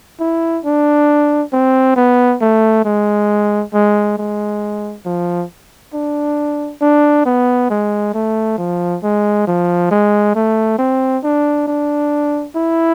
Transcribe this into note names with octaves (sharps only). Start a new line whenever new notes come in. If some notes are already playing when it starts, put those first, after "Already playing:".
E4
D4
C4
B3
A3
G#3
G#3
G#3
F3
D4
D4
B3
G#3
A3
F3
G#3
F3
G#3
A3
C4
D4
D4
E4